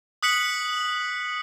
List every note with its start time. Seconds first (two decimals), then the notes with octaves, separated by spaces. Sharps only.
0.23 D#6 F#6 B6 C#7 F#7